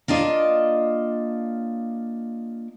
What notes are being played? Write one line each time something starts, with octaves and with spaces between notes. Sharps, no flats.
A#3 D4 F4 D#5